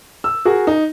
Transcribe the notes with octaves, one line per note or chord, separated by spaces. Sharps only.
E6
F#4 G#4 A#4
D#4